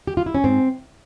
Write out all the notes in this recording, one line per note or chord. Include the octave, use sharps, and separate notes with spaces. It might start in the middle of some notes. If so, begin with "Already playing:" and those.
G4
F4
E4
C#4
G#2 C4